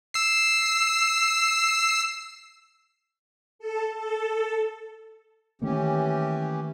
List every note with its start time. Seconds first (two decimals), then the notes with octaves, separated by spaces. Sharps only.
0.14 E6 C7
3.59 A4
3.96 A4
5.62 D#3 E3 A3 A#3 C#4 G4